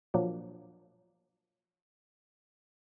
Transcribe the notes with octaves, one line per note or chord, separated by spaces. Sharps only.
A#2 F3 F#3 A#3 D4